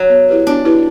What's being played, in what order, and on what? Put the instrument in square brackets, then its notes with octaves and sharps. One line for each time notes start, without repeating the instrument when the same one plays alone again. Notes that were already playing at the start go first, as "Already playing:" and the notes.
Already playing: [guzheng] F#3
[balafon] B3
E4 G4 B4
[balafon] B3 [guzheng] D4
[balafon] E4 G4 B4